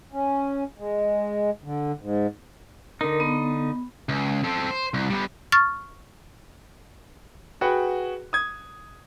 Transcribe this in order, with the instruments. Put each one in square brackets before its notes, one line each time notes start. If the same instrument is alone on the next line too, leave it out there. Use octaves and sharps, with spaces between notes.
[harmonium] C#4
G#3
D3
G#2
[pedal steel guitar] D3 D#4 [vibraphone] A#4
[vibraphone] B3
[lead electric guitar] C#2
C4 A4
C5
C2
G3 B3
[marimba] C#6 F6 A6
[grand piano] F#4 G#4 B4 F#5 G5
D#6 G#6